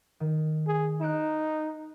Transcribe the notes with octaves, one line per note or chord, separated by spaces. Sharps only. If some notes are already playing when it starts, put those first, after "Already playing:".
D#3
G#4
D#4 F#6 D7 E7